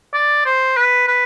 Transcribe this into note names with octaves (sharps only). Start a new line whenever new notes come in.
D5
C5
B4
B4